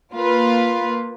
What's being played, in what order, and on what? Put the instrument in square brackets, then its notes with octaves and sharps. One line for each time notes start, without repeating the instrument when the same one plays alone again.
[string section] A#3 F4 B4